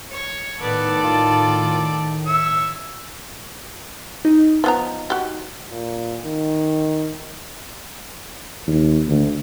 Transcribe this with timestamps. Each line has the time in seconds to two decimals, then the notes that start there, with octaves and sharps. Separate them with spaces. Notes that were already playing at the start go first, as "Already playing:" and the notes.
0.11 C#5
0.60 A2 D#3 B3 A4 D5
1.03 F4
2.26 C#5 E5 E6
4.25 D#4
4.64 F3 B3 A#5
5.10 F#4 G4
5.70 A#2
6.25 D#3
8.67 D#2
9.08 D2